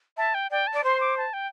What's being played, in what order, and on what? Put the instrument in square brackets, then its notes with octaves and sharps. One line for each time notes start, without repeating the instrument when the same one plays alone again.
[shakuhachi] E5 [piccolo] A5
[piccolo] G5
[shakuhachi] D5 [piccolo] G5
[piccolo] A5
[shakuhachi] D5
[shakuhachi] C5 [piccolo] C6
[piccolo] D6
A5
G5